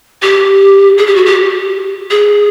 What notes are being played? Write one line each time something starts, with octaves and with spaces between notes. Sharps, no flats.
G4
G#4
G4
F#4
G4
G#4